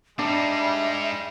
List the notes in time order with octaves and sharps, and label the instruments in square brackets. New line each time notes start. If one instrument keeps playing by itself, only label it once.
[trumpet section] G3 [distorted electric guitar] G#3 D#4 [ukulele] D4 [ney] E5